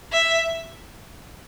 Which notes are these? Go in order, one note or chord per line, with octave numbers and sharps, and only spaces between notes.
E5